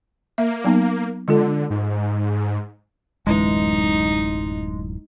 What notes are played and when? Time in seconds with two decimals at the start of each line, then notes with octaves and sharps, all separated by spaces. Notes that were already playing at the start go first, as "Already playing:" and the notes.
0.38 A#3 E5
0.64 F#3 B3 D#4
1.28 D3 G#3 F4 A4
1.70 G#2
3.27 D1 F#2 E3 G#3 D#4